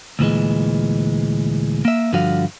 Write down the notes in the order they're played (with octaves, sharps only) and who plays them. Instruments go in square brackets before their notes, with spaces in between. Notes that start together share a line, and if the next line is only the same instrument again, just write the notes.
[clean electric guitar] D2 A#2 E3 G#3
A#3 E5
G2 D3 F3 F#4 C#5 F5